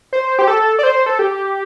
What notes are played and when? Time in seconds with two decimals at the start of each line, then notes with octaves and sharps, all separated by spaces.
0.13 C5
0.39 G4
0.48 A4
0.79 D5
0.83 C5
1.06 A4
1.19 G4